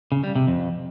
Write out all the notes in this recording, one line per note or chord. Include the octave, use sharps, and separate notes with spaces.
C#3
G3
C3
F2